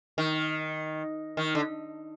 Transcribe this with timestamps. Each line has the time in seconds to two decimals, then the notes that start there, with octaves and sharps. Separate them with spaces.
0.18 D#3
1.37 D#3
1.55 D3